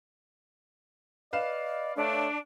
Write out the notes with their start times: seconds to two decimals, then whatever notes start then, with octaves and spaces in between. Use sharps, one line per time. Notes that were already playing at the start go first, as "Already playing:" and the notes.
1.33 B4 D5 D#5 F5 E7
1.97 A3 D4 C#5